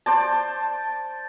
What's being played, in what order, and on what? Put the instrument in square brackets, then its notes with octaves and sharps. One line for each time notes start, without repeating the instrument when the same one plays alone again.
[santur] C5 D5 A5